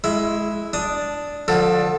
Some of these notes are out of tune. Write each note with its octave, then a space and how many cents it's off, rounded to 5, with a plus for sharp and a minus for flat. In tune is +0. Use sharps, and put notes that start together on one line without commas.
G#3 +20 E4 +0
D4 -5 D#6 +0
D3 +10 F3 +30 A4 +0